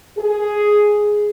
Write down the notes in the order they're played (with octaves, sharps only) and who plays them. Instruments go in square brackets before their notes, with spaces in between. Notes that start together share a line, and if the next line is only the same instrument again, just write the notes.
[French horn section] G#4